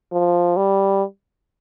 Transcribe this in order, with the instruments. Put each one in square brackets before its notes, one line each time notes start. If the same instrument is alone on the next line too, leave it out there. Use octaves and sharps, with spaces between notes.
[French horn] F3
G3